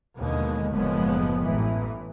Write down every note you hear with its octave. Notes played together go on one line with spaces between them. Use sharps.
D#2 B2 D3 G#3
F#1 F#2 A2 F3 G#3 B3
A1 E3